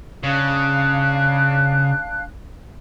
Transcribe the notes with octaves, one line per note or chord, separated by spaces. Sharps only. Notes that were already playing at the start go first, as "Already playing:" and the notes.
C#3 D4 F5 F#6